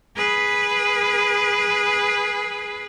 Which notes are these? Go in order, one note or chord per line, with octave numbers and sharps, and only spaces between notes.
G#4 B4